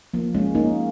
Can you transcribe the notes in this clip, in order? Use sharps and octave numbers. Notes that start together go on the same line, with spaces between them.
F3 A#3
G#3 C#4
A#3 D#4